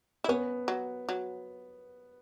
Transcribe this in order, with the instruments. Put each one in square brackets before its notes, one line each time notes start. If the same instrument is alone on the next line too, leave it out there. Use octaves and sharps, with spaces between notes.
[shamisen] E4
[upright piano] B3 [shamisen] C#4
[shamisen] F#3
F#3